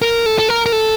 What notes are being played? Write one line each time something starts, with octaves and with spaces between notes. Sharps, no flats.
A#4
A4
A4
A#4
A#4
A4